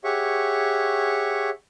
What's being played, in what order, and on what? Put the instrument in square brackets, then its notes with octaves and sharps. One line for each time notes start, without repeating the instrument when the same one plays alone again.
[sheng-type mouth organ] G4 G#4 C#5 E5 F#5 C#6